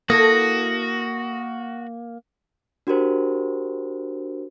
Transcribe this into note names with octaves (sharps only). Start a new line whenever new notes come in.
A#3 E4 F#4 A4 D#6 A#6
D4 F#4 G4 A#4 C5